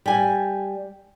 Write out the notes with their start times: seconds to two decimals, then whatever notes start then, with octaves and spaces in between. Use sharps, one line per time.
0.06 G3 G#5